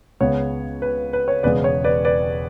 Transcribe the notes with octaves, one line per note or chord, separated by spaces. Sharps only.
C#2 C#3 G#3 B3 C#5
B4
B4
C#5
E1 E2 C#3 G#3 B3 B4 D5
C#5
B4 D5
B4 D5